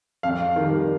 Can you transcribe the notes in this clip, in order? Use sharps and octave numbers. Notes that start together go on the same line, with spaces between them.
F2 F5
D#3 G3